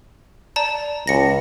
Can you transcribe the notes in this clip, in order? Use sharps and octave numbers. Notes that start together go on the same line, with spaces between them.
D5 A5 A#5
C#2 A#6 C#7